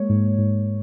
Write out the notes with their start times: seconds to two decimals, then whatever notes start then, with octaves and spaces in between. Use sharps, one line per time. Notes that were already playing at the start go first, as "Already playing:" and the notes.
Already playing: G#3 A#3 C#5
0.09 G#2
0.38 G#2